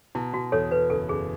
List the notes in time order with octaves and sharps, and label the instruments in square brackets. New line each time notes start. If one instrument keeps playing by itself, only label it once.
[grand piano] B2 [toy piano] E4
[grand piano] B2 [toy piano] F#4
[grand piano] E2 [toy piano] A4 C#5
[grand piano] B2 [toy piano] B4
[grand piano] F#1 [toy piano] A4
[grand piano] F#1 [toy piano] G#4